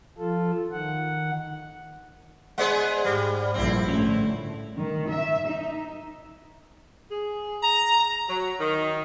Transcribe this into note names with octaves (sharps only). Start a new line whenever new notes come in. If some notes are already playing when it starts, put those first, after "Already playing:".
F3 F4 A4
D#3 F#5
G#3 B3 G#4 C5 D5 F#5
G#2 G3
A#1 G2 F3 C4 E4
A2 D3 A3 C#4
D#3
E5
D#4
G#4
A#5
F#3
D#3